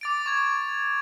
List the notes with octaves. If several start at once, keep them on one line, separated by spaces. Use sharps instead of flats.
D6 A6 D7
C#6 G#6